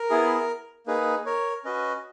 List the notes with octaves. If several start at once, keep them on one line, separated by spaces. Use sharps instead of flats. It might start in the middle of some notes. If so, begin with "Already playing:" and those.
Already playing: A#4
B3 E4 G#4
A#3 D#4 G#4 B4
A#4 C#5
C#4 F#4 B4 D#5